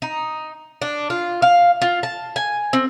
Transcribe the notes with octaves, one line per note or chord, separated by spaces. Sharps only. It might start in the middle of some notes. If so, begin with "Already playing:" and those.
D#4
D4
F4
F5
F4
A5
G#5
C4